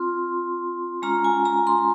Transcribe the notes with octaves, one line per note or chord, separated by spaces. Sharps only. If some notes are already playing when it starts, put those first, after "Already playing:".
Already playing: C4 F4 C6
G#3 C#4 F4 A#5
G#5
A#5
C6